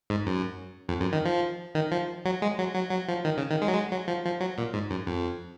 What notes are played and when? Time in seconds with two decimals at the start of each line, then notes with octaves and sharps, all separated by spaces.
0.10 G#2
0.27 F#2
0.89 F2
1.01 F#2
1.13 D#3
1.25 F3
1.75 D#3
1.92 F3
2.25 F#3
2.42 G#3
2.59 F#3
2.75 F#3
2.91 F#3
3.08 F3
3.25 D#3
3.37 C#3
3.50 D#3
3.62 G#3
3.68 F#3
3.74 G#3
3.91 F#3
4.08 F3
4.25 F3
4.40 F#3
4.58 A#2
4.74 G#2
4.90 F#2
5.07 F2